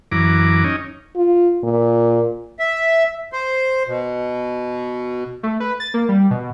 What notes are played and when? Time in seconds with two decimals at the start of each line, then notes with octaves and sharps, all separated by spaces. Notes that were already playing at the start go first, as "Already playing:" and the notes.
0.12 F#2 E3 A#5 D6
0.64 C#4 D#4
1.16 F4
1.63 A#2
2.59 E5
3.33 C5
3.88 B2
5.43 A3
5.60 B4
5.80 A6
5.94 A#3
6.09 G3
6.31 B2